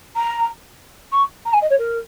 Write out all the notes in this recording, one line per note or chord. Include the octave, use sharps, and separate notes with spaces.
A#5
C#6
A#5
G#5
D#5
C#5
A#4